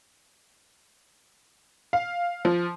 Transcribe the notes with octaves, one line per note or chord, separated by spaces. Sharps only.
F5
F3